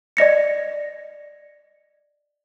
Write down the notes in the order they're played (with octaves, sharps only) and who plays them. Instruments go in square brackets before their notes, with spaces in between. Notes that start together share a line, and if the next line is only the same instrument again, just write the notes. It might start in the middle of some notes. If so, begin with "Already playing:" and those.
[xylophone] D5 D#5 A#6 C#7